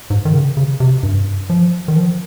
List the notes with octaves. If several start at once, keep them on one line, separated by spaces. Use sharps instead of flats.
G#2
D#3
C#3
C#3
C3
G2
F3
D#3
F3